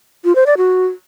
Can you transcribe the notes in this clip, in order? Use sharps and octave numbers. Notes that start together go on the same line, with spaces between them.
F4
C5
D5
F#4